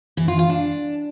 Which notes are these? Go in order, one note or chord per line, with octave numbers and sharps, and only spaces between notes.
E3
F4
F4
D4